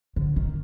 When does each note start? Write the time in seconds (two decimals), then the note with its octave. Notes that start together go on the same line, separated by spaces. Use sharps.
0.16 D3
0.36 D#3